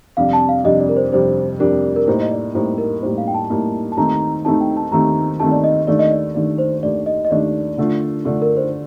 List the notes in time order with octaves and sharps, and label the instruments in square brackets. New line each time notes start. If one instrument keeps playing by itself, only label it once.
[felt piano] F2 C3 G3 D4 [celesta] F5
[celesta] A5
F5
[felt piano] F2 C3 G3 D4 [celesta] D#5
[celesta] D5
A#4
C5
[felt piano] F2 C3 G3 D4 [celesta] C5
[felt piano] F2 C3 G3 D4 [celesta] A#4
[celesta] A#4
[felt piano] A2 G3 A#3 D#4 [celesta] C5
[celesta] D#5
D5
[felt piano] A2 G3 A#3 D#4 [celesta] C5
[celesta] A#4
[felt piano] A2 G3 A#3 D#4 [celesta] C5
[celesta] F5
G5
A5
[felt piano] A2 G3 A#3 D#4
[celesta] A5
[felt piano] D#2 D#3 A3 C4 D#4 [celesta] A#5
[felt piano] D#2 D#3 A3 C4 D#4 [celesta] A5
[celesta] G5
A5
[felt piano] D#2 D#3 A3 C4 D#4 [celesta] A#5
[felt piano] D#2 D#3 A3 C4 D#4 [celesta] A5
[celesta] D5
D#5
[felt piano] D#2 D#3 A3 D4 [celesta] D5
[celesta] D#5
D5
[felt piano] D#2 D#3 A3 D4 [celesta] D5
[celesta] C5
[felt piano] D#2 D#3 A3 D4 [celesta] D5
[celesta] D#5
D#5
[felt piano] D#2 D#3 A3 D4 [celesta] D5
[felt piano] D3 A3 D4 F4
D3 A3 D4 F4
[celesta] A#4
C5